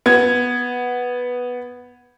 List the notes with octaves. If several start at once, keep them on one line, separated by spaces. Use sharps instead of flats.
B3 G#6